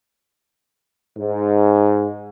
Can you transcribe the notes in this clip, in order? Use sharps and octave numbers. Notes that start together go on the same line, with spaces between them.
G#2